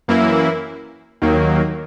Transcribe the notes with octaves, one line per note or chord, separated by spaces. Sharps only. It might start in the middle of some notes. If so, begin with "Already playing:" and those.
F#2 E3 A#3 E4
D#2 D#3 F#3 A#3